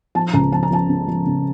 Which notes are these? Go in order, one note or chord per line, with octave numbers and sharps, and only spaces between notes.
F3 A5
C#2 A#5
F3 A5
A#5
F3 A5
C#3
F3
C#3